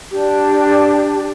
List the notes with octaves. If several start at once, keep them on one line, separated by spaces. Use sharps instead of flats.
D4 G4